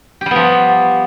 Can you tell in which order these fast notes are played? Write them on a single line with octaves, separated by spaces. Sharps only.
G4 G3 B3 F3